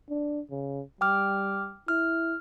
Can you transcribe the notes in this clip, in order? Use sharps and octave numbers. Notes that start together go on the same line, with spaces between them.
D4
C#3
G3 G5 D6 F6
E4 F6